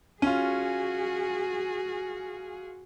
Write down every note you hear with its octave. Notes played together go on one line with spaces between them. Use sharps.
C#4 F4 F#4 G#4